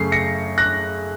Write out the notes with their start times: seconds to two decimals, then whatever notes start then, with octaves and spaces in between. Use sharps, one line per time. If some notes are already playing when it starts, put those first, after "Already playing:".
Already playing: F#2 C#3 A3 C7
0.12 A#6 C#7
0.58 F#6 A#6